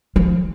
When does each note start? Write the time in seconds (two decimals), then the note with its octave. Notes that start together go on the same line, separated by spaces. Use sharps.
0.16 F3